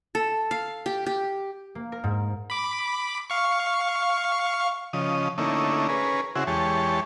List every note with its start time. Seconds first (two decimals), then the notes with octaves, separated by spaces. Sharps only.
0.15 A4
0.51 F5
0.86 G4
1.06 G4
1.75 A#3
1.92 A#4
2.04 G#2
2.50 B5 D6
3.30 F5 C#6
4.93 C#3 F3 D#5
5.38 D3 A3 A#3 C#4 D#4 E4
5.89 C#4 G#4 A#4 B4
6.35 C#3 C4 E4 F#4 G#4
6.47 E2 G#3 G4 C#5 A5